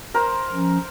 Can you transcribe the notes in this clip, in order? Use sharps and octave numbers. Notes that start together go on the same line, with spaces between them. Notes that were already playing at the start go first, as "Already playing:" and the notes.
A#4 C5
F3 C#4